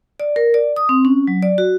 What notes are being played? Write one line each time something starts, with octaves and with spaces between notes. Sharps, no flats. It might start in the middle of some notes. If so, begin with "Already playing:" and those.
D5
A#4
D5
D#6
C4
C#4
F#3
D5
F#4